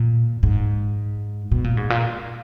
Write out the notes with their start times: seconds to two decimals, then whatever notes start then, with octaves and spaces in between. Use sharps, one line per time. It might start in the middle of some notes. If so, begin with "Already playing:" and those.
Already playing: A#2
0.43 G#2
1.52 B2
1.64 A#2
1.77 G#2
1.90 A#2